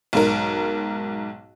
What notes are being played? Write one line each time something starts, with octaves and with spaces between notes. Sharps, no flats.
B1 G#2 A#4